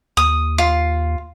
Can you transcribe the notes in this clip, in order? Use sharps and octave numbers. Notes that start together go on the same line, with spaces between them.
D#2 D#6
F4